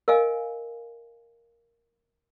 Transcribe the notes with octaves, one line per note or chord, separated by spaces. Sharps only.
A#4 D#5 F5 G#5